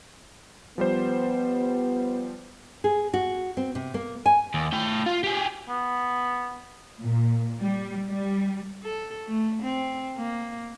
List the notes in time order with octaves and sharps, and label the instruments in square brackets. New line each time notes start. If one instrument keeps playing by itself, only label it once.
[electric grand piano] F3 G3 C5 [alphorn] B3
[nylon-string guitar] G#4
F#4
C4
C3
A#3
G#5
[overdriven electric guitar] D#2
A3 G5
F4
G4 G#4
[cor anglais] B3
[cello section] A#2
G3
G3
[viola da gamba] A4
A3
C4
A#3